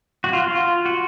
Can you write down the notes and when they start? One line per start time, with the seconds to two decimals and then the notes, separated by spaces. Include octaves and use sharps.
0.24 F#4
0.33 F4
0.44 F4
0.86 F#4